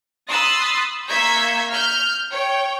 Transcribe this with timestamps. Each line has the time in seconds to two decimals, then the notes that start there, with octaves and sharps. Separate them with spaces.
0.29 B5 C6 D#6 E6 F#6 A6
1.07 A#3 E5 C#6 G6 G#6 B6
1.71 F6 G6
2.31 C#5 G5